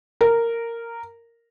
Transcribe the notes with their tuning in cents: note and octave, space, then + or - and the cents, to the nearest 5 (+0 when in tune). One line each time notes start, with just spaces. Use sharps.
A#4 -10